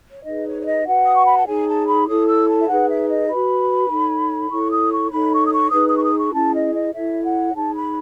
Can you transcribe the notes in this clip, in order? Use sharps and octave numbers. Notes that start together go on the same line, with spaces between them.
C#5
D#4 G#4 B4 D#5
C#5
C#5
D#5
F#4 B4 F#5
D#6
C#6
B5
A5
D#4 G#4 C#5 G#5
A5
B5
E4 A4 C#5 D#6
E6
A5
E5
D#4 G#4 B4 F#5
E5
D#5
F#4 B4 B5
D#4 A4 C#5
E4 A4 C#5 C#6
D#6
C#6
D#4 A4 C#5 B5
C#6
D#6
C#6
D#4 G#4 B4 D#6
D#6
C#6
D#6
C#6
C#4 E4 G#4 A5
D#5
D#5
E4 A4 C#5 E5
F#5
D#4 G#4 C#5 A5
B5